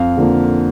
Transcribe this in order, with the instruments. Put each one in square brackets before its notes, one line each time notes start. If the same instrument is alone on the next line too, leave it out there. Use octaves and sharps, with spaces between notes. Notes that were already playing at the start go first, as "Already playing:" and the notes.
Already playing: [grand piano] F2 F5
D3 F3 A#3